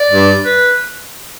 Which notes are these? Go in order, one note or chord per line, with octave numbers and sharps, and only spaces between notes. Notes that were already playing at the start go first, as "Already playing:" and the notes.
Already playing: D5
G2
B4